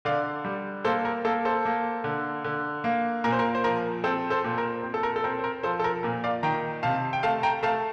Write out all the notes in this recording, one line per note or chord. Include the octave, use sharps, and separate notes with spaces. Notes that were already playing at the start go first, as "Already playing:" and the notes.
D3 D5 F5
G3
A#3 A4 C5
A#4
A#3 A4
A4 C5
A#3
D3
D3
A#3
A#2 A#4
C5
A#4
C5
F3 A#4
C4 A4
A4 C5
A#2
A#4
C4
A4
A#4
A4
C4 A#4
C5
A#4
F3 A4 C5
A4
A#4
A#2 A#4
D5 F5
D#3 G5 A#5
C3 F5 A5
G5
A3 F5 A5
G5 A#5
A3 F5 A5